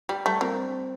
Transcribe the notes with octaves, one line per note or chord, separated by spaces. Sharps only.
G3 G4
G3 A3
A#3 C4